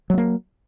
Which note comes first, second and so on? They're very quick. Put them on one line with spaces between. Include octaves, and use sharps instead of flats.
F#3 A3 A#3